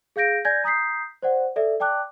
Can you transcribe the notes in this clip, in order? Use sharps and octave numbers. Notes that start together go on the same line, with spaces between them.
G#4 F5 G6 A#6 D7
D5 G#5 G6 G#6 A#6
A#5 D#6 G6 B6 C7
C5 D5 F#5
A4 D5 E5
D5 G5 A5 D6 F#6